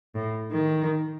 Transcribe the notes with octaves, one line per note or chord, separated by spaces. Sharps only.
A2
D#3